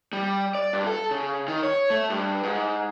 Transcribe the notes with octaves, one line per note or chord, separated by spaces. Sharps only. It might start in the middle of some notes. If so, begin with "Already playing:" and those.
G3
D5
G2
A4
C#3
D#3
C#5
A3
G2
G#2